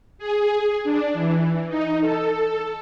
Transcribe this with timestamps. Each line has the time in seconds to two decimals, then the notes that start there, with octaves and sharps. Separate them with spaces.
0.18 G#4
0.84 D4
1.14 E3
1.68 D#4
2.00 A4